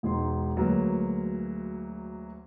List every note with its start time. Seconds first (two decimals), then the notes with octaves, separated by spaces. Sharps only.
0.03 E1 G#3 D#4 C6
0.56 D2 F#3 G#3 A#3 B3